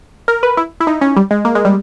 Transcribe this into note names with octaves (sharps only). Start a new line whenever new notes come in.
A#4
B4
E4
E4
D#4
C#4
G3
G#3
A#3
G#3
G3